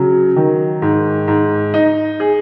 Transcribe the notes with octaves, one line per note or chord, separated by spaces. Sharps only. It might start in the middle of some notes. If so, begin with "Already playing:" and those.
Already playing: C#3 F#3
D#3
G#2
G#2
D#4
G#4